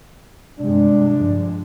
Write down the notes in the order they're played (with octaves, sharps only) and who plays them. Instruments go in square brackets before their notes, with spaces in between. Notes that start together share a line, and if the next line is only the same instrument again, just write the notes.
[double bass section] G2 C3 G#3 [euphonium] D4
[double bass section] G2 F3 G#3